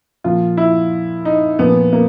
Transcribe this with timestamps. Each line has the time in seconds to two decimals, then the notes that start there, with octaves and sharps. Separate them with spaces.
0.24 A#2 F3 F4
0.57 E4
1.25 D#4
1.59 A#2 F3 B3
1.93 A#3